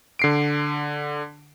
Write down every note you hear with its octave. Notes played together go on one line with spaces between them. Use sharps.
D3 C7 D7